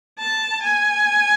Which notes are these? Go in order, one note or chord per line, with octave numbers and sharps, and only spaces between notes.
A5
G#5